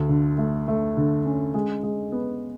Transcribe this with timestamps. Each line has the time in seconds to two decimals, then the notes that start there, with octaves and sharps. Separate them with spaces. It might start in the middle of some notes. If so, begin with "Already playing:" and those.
Already playing: D2
0.09 D3
0.38 A3
0.68 A3
0.97 D3
1.25 C#4
1.54 G#3
1.83 G#3
2.12 B3